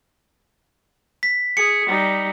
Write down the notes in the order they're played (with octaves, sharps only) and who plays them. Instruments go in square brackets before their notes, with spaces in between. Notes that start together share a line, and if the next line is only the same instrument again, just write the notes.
[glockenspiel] B6
[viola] G#4 [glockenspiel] C#7
[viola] G3 D#4